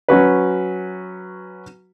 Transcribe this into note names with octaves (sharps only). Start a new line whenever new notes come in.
F#3 C#4 F#4 B4